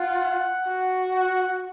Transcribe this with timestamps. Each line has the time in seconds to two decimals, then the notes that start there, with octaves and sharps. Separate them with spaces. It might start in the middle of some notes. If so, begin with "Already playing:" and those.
Already playing: F4 F#5
0.67 F#4
1.15 F#5